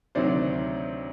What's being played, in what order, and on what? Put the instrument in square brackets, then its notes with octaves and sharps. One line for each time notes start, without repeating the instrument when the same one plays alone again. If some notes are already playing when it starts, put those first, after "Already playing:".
[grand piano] D2 C3 D#3 F#3 C5 D5